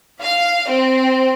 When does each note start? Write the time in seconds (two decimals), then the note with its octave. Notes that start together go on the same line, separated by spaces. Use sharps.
0.21 F5
0.69 C4